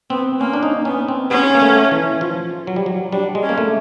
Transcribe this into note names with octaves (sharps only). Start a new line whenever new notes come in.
B3 C4
A#3 C#4
D4
D#4
B3 C#4
C4
B3 C#4
A#3
A3
E3
F3
F#3
G3
F#3
G3 D4
G#3
C#4
A#3
A3